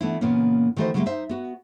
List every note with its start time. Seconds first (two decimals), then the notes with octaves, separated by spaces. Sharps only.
0.01 E3 A3 B3 D4 E4
0.21 A#2 C#3 E3 A#3 B3 C#4
0.77 D#3 E3 A3 F#4 C5 D#5
0.94 C#3 F#3 G#3 A#3 E4 G4
1.06 D#4 C5 E5
1.29 B3 F#4